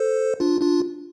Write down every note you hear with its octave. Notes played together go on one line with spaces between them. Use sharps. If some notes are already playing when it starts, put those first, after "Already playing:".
Already playing: A4 C5
D4 F4
D4 F4